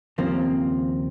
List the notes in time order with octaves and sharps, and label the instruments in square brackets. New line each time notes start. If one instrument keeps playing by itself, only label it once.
[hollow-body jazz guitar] D#2 C#3 F3 A#3 [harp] C4